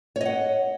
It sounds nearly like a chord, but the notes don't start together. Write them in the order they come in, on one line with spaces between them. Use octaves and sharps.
C#5 D#5 F#5